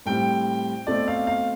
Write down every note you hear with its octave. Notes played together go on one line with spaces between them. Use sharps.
A2 G3 C4 G5
B2 A3 C4 D5
F5
F5